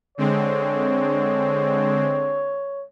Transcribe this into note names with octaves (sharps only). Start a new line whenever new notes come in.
D3 G#3 C4 C#5